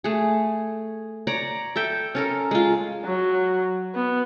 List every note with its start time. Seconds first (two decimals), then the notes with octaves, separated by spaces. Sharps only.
0.04 A3 G#4
1.27 C#5 D5 A#5
1.76 A4 E5 G5
2.15 C#4 A4 A#4
2.51 G#3 F4
3.05 F#3
3.95 B3